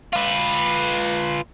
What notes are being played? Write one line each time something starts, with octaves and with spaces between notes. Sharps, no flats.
F4 B4